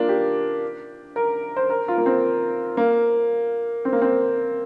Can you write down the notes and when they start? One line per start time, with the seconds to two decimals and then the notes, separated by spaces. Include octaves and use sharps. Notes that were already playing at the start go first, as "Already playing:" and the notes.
Already playing: A#3 D4 F4
0.09 G4
1.16 A#4
1.56 C5
1.70 A#4
1.88 F4
1.98 A#3
2.06 C4
2.77 A#3
3.85 C4
3.93 A#3
4.02 C4